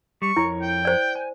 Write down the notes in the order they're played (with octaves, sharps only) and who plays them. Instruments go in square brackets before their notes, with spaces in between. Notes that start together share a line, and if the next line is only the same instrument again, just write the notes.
[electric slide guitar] G3 [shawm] C#6
[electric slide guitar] F2 A#4 C#5 [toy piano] E4
[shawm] G5
[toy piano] C5 D5
[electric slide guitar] G#5